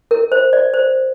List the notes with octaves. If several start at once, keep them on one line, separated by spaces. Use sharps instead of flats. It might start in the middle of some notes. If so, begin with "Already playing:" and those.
A#4
C5
D5
C5